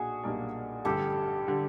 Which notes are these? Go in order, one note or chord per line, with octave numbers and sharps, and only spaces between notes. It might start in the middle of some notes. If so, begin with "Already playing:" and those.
Already playing: B1 A#2 A#3 D4 F#4 G#4
B1 A#2 G3 A#3 D4
A1 G2 D3 G3 G4 A4
D3 G3